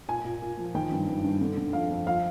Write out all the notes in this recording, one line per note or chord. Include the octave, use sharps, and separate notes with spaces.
A#2 G#5
A#2
A#2
F3
D#3 G5
G2
G2
G2
D3
D3
F2 F5
F2
F3 F5